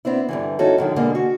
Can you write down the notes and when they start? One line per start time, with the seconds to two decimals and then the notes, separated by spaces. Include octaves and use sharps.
0.05 B3 C4 D4 E4
0.29 G2 D3 E3
0.59 C#4 D#4 E4 F#4 A4
0.78 F#2 D3 D#3
0.96 B2 D3 G#3 A#3
1.15 F#4